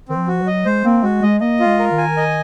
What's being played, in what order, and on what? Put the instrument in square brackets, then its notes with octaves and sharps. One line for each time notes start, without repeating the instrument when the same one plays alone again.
[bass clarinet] D#3 [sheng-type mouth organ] C4
[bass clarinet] F3
[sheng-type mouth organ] F#4
[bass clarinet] F#3
[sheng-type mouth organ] D#5
[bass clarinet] G#3 [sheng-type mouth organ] C5
[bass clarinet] A#3 [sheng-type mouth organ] C4
[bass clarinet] G#3 [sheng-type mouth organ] F#4
[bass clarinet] G#3 [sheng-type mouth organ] D#5
[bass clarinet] A#3 [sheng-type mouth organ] D#5
[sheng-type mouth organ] F4
[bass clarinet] G#3
[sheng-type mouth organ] A#4
[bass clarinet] D#3
[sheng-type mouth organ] G#5
D#5